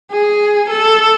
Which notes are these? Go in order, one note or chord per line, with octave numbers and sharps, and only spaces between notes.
G#4
A4